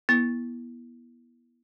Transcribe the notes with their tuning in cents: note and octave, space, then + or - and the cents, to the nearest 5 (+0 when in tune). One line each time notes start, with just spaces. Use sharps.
B3 -35 E4 +0